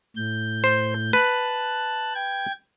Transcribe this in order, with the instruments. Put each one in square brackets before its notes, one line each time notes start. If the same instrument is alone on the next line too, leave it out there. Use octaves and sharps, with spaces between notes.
[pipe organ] A2 G6
[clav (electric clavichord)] C5
[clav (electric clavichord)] B4 [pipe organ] A5 F#6
[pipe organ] G5 G#6